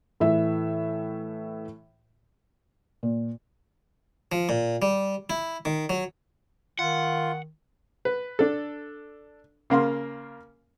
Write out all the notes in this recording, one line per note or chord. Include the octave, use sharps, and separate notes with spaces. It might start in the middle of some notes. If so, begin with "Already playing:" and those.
A2 E3 E5
A#2
F3
A#2
G3
E4
D#3
F#3
D#3 F4 F#5
B4
D4 A4
C#3 A#3 F5 C6